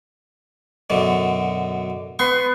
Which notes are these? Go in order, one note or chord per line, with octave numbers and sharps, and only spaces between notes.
F#2 B2 D3
B3 C6 C#6